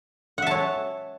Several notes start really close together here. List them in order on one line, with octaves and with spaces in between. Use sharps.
F#5 E5 A5 C#5